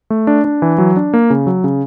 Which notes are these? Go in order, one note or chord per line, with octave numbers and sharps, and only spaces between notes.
A3
D4
D4
E3
F#3
D4
A#3
C#3
F#3
C#3